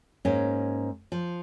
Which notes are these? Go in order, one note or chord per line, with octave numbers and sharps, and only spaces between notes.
G#2 A#3 C#4
F3